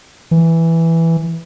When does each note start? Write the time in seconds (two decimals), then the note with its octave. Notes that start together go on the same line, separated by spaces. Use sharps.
0.31 E3